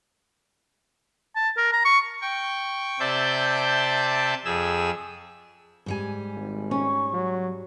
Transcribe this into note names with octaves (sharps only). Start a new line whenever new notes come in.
A5
A#4
A#5
C#6
G5 C#6
C3 C5 D5 E5 A5 G6
F2 G#4 E6
G#2 G3 G#5
G#1
C#4 C#6
F#3